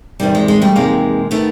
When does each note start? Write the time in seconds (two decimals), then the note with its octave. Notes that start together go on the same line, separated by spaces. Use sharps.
0.20 E2 C3 D#3 G3
0.35 G#3
0.48 G#3
0.62 G3 A3
0.76 E2 C3 D#3 G#3 A#3
1.31 D#3 A3 B3